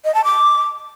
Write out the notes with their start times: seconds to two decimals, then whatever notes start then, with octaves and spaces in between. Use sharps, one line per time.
0.05 D#5
0.15 A5
0.24 D6